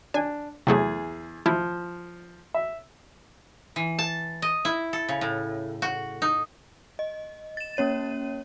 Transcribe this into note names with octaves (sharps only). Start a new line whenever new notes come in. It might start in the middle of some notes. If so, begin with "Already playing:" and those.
D4 G#5
E2 C3 F#3 A3 G#4
F3 E4
E5
E3
A5
D#5
E4
A4
C#3
A2
F#4
D#4
D#5
A6 E7
A#3 C#4 C#5 D#7